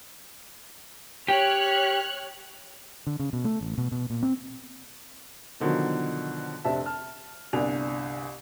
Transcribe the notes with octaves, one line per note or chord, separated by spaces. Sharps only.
G4 C#5 F6 F#6
D3
C#3
B2
A3
A1
B2
B2
A#2
C4
B2 D3 D#3 F3 F#3
F1 C3 C4 D4 E5 A5
A5 F6
G1 C2 D4 A#4 G#5 F7